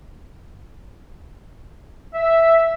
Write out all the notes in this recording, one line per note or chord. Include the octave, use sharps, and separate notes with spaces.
E5